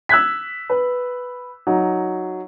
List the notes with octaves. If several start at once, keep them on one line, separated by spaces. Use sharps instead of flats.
E6 F#6 G#6 B6
B4
F#3 D#4